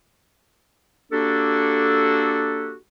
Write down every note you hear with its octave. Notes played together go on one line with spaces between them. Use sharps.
A#3 D4 F#4 G4 A4